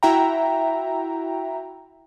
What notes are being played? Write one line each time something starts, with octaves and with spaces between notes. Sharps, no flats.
E4 F#4 E5 G5 A#5